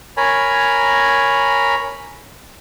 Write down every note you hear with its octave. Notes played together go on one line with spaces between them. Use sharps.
A#4 C#5 G#5 A#5 B5